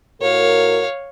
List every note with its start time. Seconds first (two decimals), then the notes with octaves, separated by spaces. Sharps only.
0.21 A2 F#4 A#4 C#5 F5